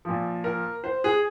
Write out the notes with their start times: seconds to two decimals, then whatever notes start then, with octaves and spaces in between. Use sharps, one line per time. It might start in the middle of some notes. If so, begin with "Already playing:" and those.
0.05 A#2 F3
0.44 A#4
0.84 C5
1.04 G#4